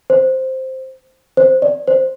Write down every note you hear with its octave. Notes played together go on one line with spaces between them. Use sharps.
C5
C5
D5
C5